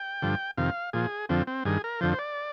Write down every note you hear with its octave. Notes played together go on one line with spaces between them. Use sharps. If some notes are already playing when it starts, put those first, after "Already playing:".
Already playing: G5
G2 D3 F3
F2 C3 D#3 F5
A#2 F3 G#4
F2 D3 F3 C4
C4
G2 D#3 G#4
A#4
F2 D3 F3 C5
C5
D5